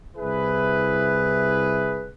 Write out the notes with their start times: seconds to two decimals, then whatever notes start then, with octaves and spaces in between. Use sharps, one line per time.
0.17 C2 E4 G#4 B4